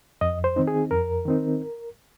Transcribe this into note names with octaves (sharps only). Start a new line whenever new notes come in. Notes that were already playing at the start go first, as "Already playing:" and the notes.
F2 D#5
C5
D#3 C4 D#4
G#4
F2 A#4
D#3 C4 D#4